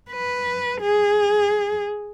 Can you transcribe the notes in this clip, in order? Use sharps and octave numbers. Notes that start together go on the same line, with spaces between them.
B4
G#4